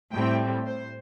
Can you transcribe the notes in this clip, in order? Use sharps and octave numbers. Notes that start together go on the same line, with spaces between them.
A2 G3 C4 G5
C5